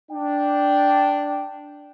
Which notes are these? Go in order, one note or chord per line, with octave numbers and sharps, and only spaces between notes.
D4 G5